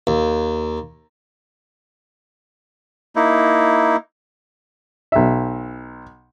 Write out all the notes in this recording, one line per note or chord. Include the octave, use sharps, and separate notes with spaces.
D#2
A#3 D#4 E4
B1 E5